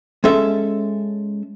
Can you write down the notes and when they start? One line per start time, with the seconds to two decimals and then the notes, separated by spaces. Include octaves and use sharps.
0.24 G#3 C#4 A4 E5